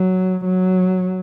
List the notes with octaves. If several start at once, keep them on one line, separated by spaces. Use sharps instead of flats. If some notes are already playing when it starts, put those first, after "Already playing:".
Already playing: F#3
F#3